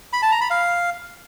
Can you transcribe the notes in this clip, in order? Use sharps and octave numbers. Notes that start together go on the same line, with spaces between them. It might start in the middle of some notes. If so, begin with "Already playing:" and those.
B5
A5
A#5
B5
F5